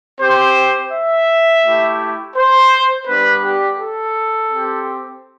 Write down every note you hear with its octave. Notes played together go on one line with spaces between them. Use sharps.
C4 G4 C5
E5
A3 E4 G4
C5
G3 B3 D4 B4
G4
A4
C4 G4